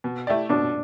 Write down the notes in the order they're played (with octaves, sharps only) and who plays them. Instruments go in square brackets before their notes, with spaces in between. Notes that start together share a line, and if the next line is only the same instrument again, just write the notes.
[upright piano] B2
A3 E4 G4 D5
[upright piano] B2 [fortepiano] D4